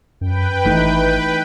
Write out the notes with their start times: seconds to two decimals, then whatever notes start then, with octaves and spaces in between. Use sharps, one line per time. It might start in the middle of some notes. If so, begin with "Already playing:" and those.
0.21 F#2 B4 G5
0.65 G#1 E3 A3 D#4